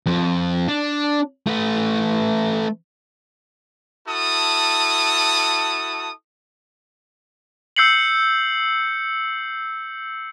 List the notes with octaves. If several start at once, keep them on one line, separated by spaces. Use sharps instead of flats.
F2
D4
A3 B4
E4 F#4 A4 A5 D#6
E6 G6 C7 C#7 F#7